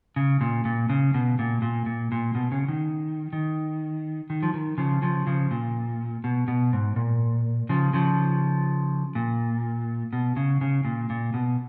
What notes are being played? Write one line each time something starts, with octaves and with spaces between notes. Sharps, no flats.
C#3
A#2
A#2
C#3
B2
A#2
A#2
A#2
A#2
B2
C#3
D#3
D#3
D#3
F3
D#3
C#3 F3
C#3 F3
C#3 F3
A#2
B2
B2
G#2
A#2
C#3 F3
C#3 F3
A#2
B2
C#3
C#3
A#2
A#2
B2